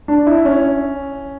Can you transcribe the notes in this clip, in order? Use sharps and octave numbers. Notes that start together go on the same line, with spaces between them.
D4
E4
C#4